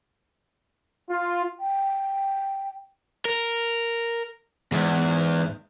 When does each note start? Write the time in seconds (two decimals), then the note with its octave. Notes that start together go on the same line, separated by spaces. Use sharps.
1.09 F4
1.60 G5
3.25 A#4
4.72 E2 G#2